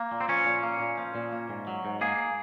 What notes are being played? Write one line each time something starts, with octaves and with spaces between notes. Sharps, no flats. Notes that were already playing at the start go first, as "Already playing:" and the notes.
Already playing: A#3
A#2
C4
F3 C#4
A#2
A#3
A#2
F3
A#2
A#3
G#2
F#3
G#2
A#3 G#4